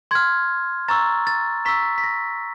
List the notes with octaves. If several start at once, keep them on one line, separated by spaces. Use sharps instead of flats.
C6 F6 G#6
A#5 C#6 E6 A6
A6
A#5 C#6 E6 B6
B6
A#6